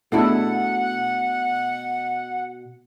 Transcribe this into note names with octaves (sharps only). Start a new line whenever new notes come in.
B2 A3 B3 D4 E4 G#4 A4 F#5